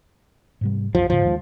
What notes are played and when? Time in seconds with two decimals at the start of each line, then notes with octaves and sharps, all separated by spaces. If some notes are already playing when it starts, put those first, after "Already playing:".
0.61 G#2 C3 G3
0.95 C2 F#2 F3
1.10 E1 G#2 C#3 F3
1.25 D#2 D#3 G#3